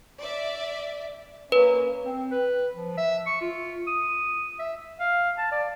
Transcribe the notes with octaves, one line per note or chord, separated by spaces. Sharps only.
D5 E5
A#3 C#4 B4
C4
B4
F3
E5
C#6
F4
D#6
E5
F5
A5
D5